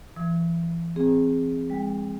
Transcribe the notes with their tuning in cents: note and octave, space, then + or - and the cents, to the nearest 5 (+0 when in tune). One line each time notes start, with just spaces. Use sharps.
E3 +35 E6 -40
C4 +0 G#4 -10
G#3 -40 G5 +0